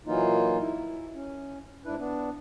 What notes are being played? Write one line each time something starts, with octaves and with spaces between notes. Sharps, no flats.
A#2 E3 F#3 A#3 D#4 F4
E4
C#4
G#2 D4 E4 B4
B3 D4